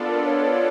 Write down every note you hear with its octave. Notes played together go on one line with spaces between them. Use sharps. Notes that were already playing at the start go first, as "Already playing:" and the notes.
Already playing: B3 D4 F4 A4 D5
A#4
C#5